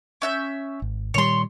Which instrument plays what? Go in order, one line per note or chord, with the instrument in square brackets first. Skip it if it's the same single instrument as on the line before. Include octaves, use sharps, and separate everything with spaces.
[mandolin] C#4 E5 G6
[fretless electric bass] G#1
[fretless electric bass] A#2 D#3 G3 [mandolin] C#5 C6